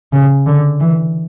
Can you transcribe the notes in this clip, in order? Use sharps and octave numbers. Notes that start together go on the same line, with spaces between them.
C#3
D3
E3